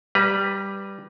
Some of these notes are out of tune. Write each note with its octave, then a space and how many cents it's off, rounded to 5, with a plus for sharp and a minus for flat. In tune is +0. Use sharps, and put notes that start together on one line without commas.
G3 +0 B4 +0 A#5 +40